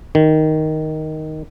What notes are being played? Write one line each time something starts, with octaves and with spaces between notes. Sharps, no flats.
D#3